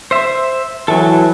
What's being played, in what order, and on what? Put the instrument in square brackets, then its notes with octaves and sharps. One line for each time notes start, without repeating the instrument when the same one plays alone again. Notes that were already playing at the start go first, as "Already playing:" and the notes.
[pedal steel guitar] C5 E5
[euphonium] E3 [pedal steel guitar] F#3 A4